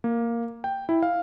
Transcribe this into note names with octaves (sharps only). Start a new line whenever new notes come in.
A#3
G5
E4
F5